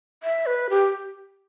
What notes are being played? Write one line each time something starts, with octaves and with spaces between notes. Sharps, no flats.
E5
B4
G4